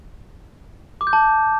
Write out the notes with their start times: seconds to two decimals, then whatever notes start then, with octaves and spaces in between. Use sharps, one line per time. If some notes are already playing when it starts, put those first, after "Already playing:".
1.01 D6
1.07 G6
1.13 A5